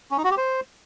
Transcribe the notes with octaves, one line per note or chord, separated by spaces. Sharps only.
C#4
D#4
F#4
G4
C5